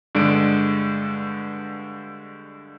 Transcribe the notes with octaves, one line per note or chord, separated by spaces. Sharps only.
G2 D3 G#3 D5 D7